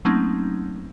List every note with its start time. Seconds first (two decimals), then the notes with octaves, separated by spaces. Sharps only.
0.05 F#3 A3 A#3 C4 C#4 D#4